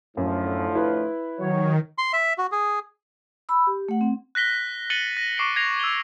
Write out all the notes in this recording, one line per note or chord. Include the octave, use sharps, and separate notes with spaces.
F#2 A2 D3 F3
E4 B4
D#3 F#3 C#5
C6
E5
F#4
G#4
B5 E6
G4
A3 F#5
C4
F#6 A#6 B6 G7
F#6 A6 C#7 D#7 F#7 G7
A#6
C#6 D6 C7 D7 F#7
G#6 A#6 C7 F7
E6 G7